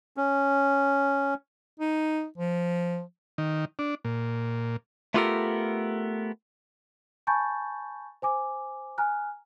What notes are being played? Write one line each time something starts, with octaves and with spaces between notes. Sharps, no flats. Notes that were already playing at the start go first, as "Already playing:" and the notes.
C#4
D#4
F3
D#3
D4
A#2
A3 B3 F4 G4 A4 A#4
G#5 A5 B5 C#6 G6 A6
C5 G#5 D6
G#5 A#5 F6 F#6